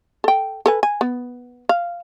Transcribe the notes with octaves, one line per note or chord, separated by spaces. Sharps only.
A4 G5
A4 B4 G#5
G#5
B3
F5